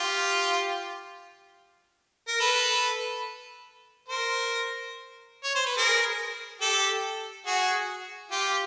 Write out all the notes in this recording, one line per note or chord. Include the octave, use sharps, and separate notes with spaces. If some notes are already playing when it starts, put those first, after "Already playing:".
Already playing: F4 G4
A#4
A4 B4
A#4 C5
C#5
C5
B4
G#4 A#4
G4 A4
F#4 G#4
F4 G4